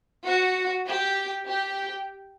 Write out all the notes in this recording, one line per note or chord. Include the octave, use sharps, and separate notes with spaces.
F#4
G4
G4